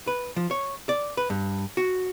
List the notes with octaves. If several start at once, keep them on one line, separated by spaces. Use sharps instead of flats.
B4
F3
C#5
D5
B4
G2
F#4